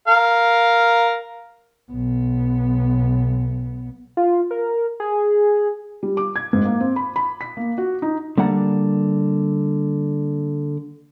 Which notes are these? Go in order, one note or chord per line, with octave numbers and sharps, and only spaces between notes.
A#4 F5
B1 B3
F4
A#4
G#4
G3
D6
G#6
G#2
A#3
C4
B5
B5
B6
A#3
F#4
D#4
D3 G3 A#3 D5 F#5 A#5